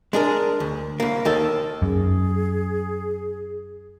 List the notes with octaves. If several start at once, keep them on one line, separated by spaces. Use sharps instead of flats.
G#3 D4 G#4 A#4
D2
C2 A#3
D#2 D#3 A4
F#2 G#4